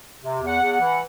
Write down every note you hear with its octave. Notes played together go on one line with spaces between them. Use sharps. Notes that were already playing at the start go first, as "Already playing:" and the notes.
C3
E2
F#5
E2
F#5
E3